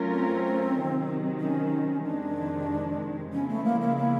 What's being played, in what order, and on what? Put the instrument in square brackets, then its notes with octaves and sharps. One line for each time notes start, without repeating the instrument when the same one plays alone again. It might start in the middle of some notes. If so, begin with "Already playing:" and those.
Already playing: [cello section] F#3 A3 C#4 F4 A#4
[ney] C4
[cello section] C3 D#3 F#3
[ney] C#4
[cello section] F2 C3 D#3 G#3 [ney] D4
[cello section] C#3 F3 G#3 B3 E4 [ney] C#4
[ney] A3
A#3
A#3
A#3